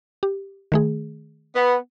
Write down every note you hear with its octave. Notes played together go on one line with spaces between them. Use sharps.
G4
D#3 A3 G#4
B3